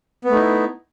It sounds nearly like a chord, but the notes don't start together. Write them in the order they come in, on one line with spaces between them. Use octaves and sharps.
B3 A3 D#4 E4